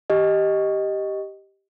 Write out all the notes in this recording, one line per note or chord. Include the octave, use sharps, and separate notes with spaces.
G4 D#5